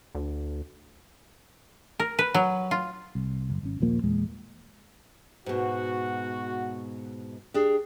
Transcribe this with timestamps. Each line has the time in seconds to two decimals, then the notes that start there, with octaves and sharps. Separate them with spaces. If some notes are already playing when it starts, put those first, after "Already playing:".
0.15 D2
2.00 A#4
2.19 B4
2.34 F#3
2.71 F4
3.15 C2
3.50 F#1
3.63 G#1 C#4
3.80 D#1 A#1 F3 A#3
4.03 E2 A#2 G#3
5.46 G#2 B2 F#4
7.54 D4 G4 G#4